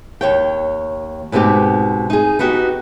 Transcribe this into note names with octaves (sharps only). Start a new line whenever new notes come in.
D#2 C#5 G5
G#2 B2 C4 D#4 G4
D#4 G#4
B3 D#4 F#4 G4